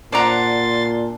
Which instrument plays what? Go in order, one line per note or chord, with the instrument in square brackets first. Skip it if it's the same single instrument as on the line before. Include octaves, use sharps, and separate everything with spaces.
[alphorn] A#2 [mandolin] D4 F#5 [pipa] C5 D5 A#5 [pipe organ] C6 A6